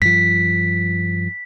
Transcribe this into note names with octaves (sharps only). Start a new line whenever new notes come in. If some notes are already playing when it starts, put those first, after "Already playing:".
G2 F3 B6